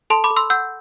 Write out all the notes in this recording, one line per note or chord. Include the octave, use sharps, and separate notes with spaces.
A4 A5 C6
B5 D6
A4
C6 E6
F#5 E6 G6